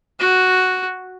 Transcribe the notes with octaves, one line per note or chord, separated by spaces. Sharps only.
F#4